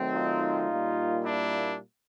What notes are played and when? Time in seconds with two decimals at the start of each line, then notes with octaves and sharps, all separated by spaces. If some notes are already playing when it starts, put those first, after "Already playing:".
Already playing: D#3 F#3 A3 C4
0.13 D#4 F4
0.69 A#2 G3 A#3
1.24 D4 E4